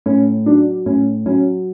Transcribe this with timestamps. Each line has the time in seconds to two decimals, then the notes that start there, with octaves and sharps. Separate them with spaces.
0.06 A2 C#4
0.46 F#3 D4
0.86 A2 C#4
1.26 F#3 C#4